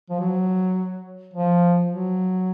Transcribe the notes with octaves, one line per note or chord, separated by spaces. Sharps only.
F3
F#3
F3
F#3